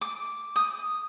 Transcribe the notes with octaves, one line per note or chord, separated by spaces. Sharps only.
D6
D#6